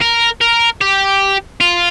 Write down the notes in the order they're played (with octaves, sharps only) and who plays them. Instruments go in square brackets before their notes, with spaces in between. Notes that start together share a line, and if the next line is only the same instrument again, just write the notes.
[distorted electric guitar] A#4
A#4
G4
F4